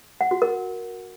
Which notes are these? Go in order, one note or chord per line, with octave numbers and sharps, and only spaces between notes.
F#5
F#4
A#4